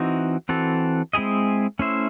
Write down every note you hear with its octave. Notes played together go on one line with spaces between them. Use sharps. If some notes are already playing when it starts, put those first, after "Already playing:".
Already playing: E3 C4 D#4 F#4
E3 C4 F#4 A4
G#3 C4 E4 G#4 D#5
A3 C#4 E4 C5 E5